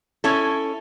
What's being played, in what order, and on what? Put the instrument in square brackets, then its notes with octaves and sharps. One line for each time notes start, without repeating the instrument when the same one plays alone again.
[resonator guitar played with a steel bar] C#4 E4 A4